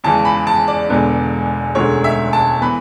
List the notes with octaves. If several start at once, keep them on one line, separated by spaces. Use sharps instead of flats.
E2 C#3 E3 G#3 A5
B5
A5
D5
E1 E2 D3 G#3 B3
E1 D2 D3 G#3 C#4 C#5
E5
A5
E3 B3 B5